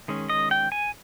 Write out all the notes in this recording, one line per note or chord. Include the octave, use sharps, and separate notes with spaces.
D#3 G#3 C#4
D#5
G5
G#5